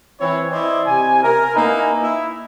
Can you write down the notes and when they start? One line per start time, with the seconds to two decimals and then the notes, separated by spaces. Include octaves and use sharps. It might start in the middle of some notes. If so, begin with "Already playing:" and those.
0.20 E3 C4 E4 C#5
0.52 E4 C5 D5 D#5
0.87 C3 G#5
1.23 A#4
1.55 A#3 D#4 E4 B4 G#5
2.03 E4